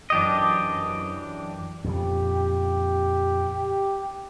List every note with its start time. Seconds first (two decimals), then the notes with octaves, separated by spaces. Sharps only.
0.10 F#2 E3 D4 G4 D#5
1.84 F2 A#2 C#3 G4